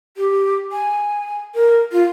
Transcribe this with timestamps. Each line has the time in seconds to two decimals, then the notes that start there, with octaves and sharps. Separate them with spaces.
0.17 G4
0.72 G#5
1.55 A#4
1.92 F4